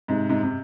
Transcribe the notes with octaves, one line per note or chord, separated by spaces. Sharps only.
G#2 C3
G#2 C3
C3